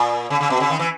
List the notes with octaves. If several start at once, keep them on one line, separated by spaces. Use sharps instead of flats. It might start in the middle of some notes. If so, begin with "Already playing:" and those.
Already playing: A#2
C#3
C#3
B2
C#3
D#3
E3